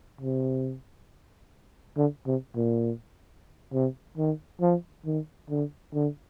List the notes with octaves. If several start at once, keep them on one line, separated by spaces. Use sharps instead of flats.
C3
D3
C3
A#2
C3
D#3
F3
D#3
D3
D3